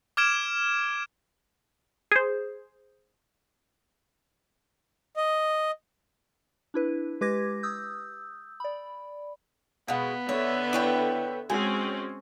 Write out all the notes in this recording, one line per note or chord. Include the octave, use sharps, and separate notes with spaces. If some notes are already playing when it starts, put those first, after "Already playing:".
D6 F6 G#6 D7 E7
G#4 C5
D#5
D4 E4 B4
G#3 G4 B4 D6 G#6 A#6
D#6 E6 G6
D5 B5
B2 G#3 B3 F5 F#5
D3 C#5 E5
E4 B4 C#5 D5 G5
G#3 C4 C#4 F#4 G#5